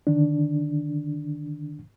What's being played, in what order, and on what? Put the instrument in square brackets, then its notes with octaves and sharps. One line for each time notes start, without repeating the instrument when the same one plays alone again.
[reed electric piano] D3 D#3 D4